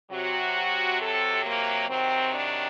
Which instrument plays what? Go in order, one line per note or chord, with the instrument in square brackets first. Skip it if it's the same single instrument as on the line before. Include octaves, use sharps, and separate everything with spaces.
[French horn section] C3 F#3 F#4
A4
A#3
C3 D#3 F#3 C4
D4